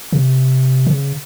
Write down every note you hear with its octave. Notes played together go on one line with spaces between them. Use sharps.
C3
C#3